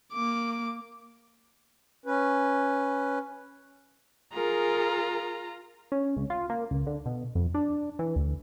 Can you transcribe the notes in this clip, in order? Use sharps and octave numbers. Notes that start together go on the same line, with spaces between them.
A#3 D6
C#4 B4
F4 G#4 A#4 A#5
C#4
C#2
F4
A#3
C#2
D3
B2
F2
D4
E3
D2